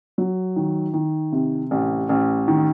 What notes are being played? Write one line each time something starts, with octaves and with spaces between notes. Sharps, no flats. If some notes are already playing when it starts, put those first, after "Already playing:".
F#3
D#3
D#3
C3
A1
A1
D#3